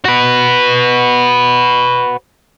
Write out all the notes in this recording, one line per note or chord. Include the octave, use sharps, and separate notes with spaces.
F#4 B4